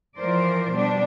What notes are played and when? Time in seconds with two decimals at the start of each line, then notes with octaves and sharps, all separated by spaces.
0.17 E3 F3 A#4 C5 D5
0.72 B2 G3 D4